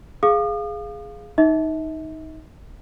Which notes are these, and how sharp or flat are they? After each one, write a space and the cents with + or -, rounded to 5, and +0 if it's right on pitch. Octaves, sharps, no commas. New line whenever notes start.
G#4 +0 F5 +0 D#6 -45
D#4 +10 E5 -40